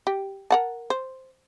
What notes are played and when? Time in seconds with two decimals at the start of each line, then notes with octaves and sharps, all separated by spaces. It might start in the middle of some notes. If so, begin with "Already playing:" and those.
0.07 G4
0.51 A#4 F#5 A5
0.90 C5